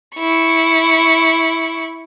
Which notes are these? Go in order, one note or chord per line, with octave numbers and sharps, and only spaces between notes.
E4 C#6